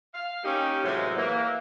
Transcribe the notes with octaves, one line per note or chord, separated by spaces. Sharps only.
F5
A#3 C#4 D#4 G4
A2 C3 E3 F#3 G#3
E3 A#3